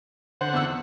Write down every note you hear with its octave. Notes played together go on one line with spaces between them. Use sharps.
D3 C5 F#5
E2 E6